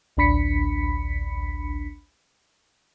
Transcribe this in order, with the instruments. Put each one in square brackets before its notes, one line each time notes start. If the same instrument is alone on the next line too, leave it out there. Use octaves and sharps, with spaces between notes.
[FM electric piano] A1 D2 D4 B5 B6 C#7